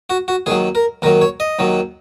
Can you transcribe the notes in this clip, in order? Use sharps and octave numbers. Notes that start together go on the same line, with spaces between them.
F#4
F#4
D#2 D#3 F#3 G#4
A#4
D#2 D#3 F#3 A#4
C#5
D#5
D#2 D#3 F#3